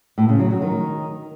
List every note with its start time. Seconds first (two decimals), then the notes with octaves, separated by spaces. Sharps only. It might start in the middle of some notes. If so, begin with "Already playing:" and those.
0.18 A2
0.29 C#3
0.40 F#3
0.51 F#3
0.62 D#3